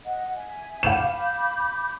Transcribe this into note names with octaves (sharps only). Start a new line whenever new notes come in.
D#5 F#5
E5 G#5
F5 B5 D6 G6 E7